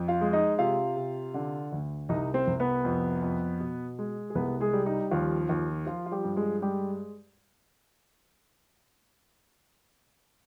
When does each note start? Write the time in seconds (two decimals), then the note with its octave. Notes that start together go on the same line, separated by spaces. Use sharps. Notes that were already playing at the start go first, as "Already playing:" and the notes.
Already playing: F2
0.08 F4 F5
0.21 G#3
0.33 D#4 D#5
0.58 C3 F4 F5
0.97 C3
1.34 D3
1.72 D2
2.09 C2 D#4 D#5
2.34 C4 C5
2.47 C2
2.60 B3 B4
2.85 F2
3.22 F2
3.60 B2
3.99 G#3
4.30 G#4
4.35 C2 B3 B4
4.60 G#3 G#4
4.73 G3
4.86 D#4
5.11 D#2 F3 F4
5.49 D#2
5.86 F3 F4
6.06 F4
6.11 G3 G4
6.24 G2
6.37 G#3 G#4
6.62 G3 G#3 G4